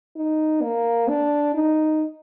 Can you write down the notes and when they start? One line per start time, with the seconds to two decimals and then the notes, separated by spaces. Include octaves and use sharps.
0.16 D#4
0.62 A#3
1.08 D4
1.54 D#4